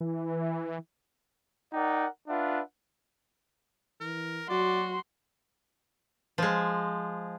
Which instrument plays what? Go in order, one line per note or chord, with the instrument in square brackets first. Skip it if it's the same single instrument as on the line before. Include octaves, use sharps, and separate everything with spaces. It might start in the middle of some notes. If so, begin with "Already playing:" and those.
[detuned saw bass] E3
[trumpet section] D#4 A#4 D5 F#5 G5
D4 F4 B4 E5 F#5
[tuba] E3 [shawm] A#4
[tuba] F#3 [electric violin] F#4 [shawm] D5 [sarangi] C6
[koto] F3 G#3